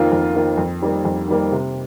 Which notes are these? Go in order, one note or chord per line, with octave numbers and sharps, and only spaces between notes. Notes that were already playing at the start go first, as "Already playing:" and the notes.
Already playing: F2 D#3 A#3 F4
F2
D#3 A#3 F4
F2
D#3 G3 A#3
F2
D#3 G3 A#3
C3